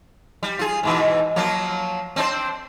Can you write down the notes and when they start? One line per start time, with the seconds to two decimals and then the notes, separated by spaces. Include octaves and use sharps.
0.43 G3
0.59 F4 G#4
0.83 G#2 B2 E3
1.36 F3 F#3 A#3
2.16 C4 D4 C5